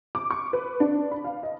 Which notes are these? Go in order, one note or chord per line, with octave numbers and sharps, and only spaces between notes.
D6
C#6
B4
D4
B5
F5
D#5